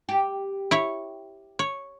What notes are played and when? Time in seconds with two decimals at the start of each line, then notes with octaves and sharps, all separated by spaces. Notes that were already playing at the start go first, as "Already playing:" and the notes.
0.09 G4
0.71 E4 C#5
1.59 C#5